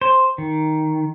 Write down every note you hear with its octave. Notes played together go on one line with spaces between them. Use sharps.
C5
D#3